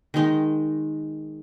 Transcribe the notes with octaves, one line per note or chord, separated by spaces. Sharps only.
D#3 G#3 D#4